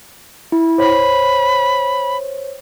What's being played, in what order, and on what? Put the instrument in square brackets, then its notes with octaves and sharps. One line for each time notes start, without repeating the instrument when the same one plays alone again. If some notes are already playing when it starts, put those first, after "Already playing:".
[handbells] E4
[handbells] C5 C#5 [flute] B5